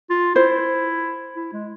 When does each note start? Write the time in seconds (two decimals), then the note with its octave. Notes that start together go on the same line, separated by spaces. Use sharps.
0.10 F4
0.35 E4 C5
1.36 E4
1.53 G#3